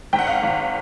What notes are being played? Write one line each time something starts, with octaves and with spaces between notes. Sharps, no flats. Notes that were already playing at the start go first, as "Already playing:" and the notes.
G#1 G5
F#5
F5
F#5
G#1